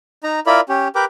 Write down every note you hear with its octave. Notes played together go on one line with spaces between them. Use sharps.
D#4 A#5
E4 F4 A#4 D5 B5
C#4 G4
G4 A#4 B4 G5 D6